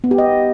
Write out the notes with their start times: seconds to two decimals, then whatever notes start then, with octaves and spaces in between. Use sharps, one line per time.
0.04 B3
0.11 G4
0.18 D#5